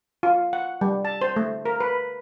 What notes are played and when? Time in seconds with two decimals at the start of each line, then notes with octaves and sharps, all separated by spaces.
0.23 F4
0.53 F#5
0.81 G3
1.05 A5
1.21 C5
1.36 A3
1.66 A#4
1.80 B4